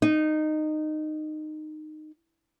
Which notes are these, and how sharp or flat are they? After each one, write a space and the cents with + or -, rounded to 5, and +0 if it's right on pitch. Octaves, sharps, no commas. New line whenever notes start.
D#4 -15